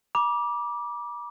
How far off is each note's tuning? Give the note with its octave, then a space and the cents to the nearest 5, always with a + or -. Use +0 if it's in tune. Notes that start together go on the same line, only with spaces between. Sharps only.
B5 -45 D6 +0